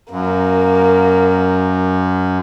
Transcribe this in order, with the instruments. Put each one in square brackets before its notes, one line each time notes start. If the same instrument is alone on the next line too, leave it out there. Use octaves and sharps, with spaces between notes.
[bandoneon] F#2 [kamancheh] A#3